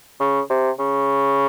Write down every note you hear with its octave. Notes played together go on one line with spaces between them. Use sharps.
C#3
C3
C#3